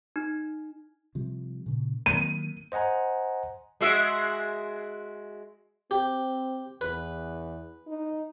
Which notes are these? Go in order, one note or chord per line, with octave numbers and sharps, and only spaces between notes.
D#4
C3 F3 G3
A#2 C#3
D#3 F#3 A#3 D#7
C5 D#5 F#5 G#5 A#5
G#3 F#4 E5
C4 G4
E2 B4
D#4